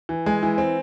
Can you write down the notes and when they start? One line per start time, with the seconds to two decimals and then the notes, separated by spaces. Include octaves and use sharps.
0.09 E3
0.26 G#3
0.43 E3
0.58 C4